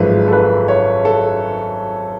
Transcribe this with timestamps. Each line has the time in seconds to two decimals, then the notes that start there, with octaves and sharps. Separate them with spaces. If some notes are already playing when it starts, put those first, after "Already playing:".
Already playing: G#1 F#2 F3 G#3 A4 B4
0.28 A4
0.33 B4
0.68 C#5
1.05 A4